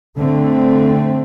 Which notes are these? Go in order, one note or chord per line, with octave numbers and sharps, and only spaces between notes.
D3 A3 C4